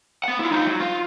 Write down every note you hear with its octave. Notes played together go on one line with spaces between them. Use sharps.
B3 F#5
E4 F4
D#4 F4
F#3
F4